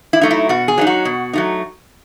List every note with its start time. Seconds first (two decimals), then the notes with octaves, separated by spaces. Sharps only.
0.13 E4
0.21 F#3 A3 D#4
0.31 E4
0.49 B2 F#4
0.68 G#4
0.78 F#3 A3 D#4
0.87 F#4
1.05 B2
1.33 F#3 A3 D#4